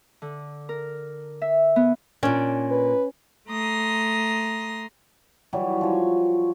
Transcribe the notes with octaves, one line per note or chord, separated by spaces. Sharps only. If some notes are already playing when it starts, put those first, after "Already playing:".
D3
A#4
E5
B3
A#2 C#4 D4
B4
A3 A#5 C6 D#6
E3 F#3 G3 E4
F3 C#5